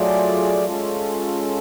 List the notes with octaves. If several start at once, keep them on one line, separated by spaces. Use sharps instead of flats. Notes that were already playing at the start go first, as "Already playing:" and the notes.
Already playing: F#3 A3 F4 G#4 D5
G#3 C#4 F4 A4